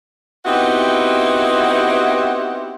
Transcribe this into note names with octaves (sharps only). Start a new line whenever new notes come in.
B3 C4 D#4 E4 F#4 G4